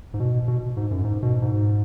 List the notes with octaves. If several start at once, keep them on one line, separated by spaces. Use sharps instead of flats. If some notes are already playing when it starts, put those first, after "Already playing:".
G#2
B2
B2
G#2
F#2
G#2
B2
G#2